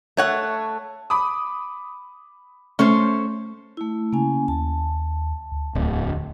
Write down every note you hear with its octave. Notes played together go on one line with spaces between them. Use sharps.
A3 C#5 F#5
B5 D6 D#6
A3 C#4 A4 C5
A3 E4
C#3 A#3 C#4 G#5
D#2 A5
D2
D1 E2